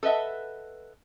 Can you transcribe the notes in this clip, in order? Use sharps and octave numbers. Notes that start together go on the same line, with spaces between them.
A4 B4 D#5 E5 F#5